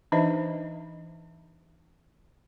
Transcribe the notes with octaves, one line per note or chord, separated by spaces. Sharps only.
E3 D4 D#4 C5 D#5 E5